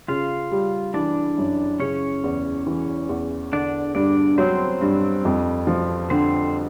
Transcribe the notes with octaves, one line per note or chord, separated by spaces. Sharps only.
C#3 F4 F5
G3
E3 D4 D5
F#2
C#3 C#4 C#5
E2
E3
E2
D3 D4 D5
G2 D4 D5
F#3 C4 C5
G2
F2
F3
D3 C4 C5